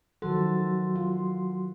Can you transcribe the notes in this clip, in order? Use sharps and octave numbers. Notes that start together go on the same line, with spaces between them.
D#3 F3 F#3 F#4 A4 C6
F4